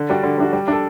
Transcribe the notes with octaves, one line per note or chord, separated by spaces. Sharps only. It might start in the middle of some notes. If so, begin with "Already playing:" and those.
Already playing: D3
G3 D4 F#4
D3
G3 D4 F#4
G3
D4 A4